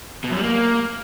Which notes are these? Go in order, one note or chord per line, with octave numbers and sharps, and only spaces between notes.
B2
F#2
G3
A#3